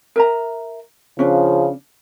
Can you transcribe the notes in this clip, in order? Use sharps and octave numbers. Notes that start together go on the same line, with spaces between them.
A#4 E5 A#5
C#3 F3 C#4 D4